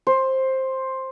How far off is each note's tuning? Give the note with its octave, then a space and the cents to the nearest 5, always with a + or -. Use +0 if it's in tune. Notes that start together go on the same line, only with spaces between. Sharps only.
C5 +10